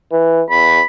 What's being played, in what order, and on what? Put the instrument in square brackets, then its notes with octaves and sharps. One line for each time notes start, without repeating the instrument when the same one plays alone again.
[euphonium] E3
[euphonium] E2 [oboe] B5